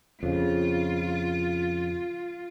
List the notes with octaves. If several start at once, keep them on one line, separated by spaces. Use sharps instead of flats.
F2 C#3 F4